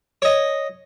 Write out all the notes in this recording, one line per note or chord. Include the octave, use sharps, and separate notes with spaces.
C#5 D#5